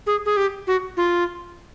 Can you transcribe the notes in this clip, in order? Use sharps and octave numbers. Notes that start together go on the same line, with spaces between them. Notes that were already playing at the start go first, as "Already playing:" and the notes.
G#4
G#4
G4
F#4
F4